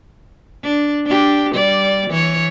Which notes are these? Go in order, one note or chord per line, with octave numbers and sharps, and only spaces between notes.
D4
D4 G4
G3 D5
E3 C#5